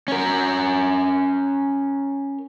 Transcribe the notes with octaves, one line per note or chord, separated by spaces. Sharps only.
C#4 A#4